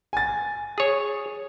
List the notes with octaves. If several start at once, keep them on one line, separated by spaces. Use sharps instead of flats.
G#5 A6
G#4 C#5